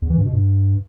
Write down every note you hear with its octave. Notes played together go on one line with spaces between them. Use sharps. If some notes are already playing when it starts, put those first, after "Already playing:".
E2
E3
G2
B2
G2